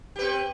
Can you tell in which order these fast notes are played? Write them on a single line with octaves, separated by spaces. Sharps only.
G4 B4 C4